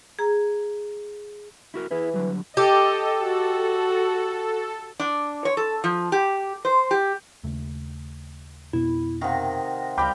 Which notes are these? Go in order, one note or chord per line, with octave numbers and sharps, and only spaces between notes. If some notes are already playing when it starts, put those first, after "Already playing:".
G#4 A#5
E4 F#4 A#4
E3 E4 G#4
D3 F#3 G3
G4 A4 D#5
F#4
D4
C#5
A4
F3
G4
C5
G4
D#2 C#3 A3
F2 B2 B3 E4
C3 D#3 F5 F#5 A#6
C#2 G3 G4 F5 G5 B5 D6